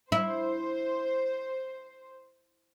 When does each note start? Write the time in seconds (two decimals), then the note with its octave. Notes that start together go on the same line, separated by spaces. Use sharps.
0.12 E4 C5